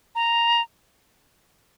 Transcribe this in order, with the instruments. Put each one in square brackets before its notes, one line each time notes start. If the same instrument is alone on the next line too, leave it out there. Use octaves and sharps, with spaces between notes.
[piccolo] A#5